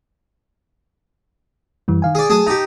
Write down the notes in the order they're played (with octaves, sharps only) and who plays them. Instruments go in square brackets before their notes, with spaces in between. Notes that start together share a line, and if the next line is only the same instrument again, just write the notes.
[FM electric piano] F#2 E3 G3
D#3 F5 G#5
[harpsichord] G#4 D5
[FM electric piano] F#3 A3 [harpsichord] G#4 A5 D#6
[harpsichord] D#4 G4 [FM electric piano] A5 D6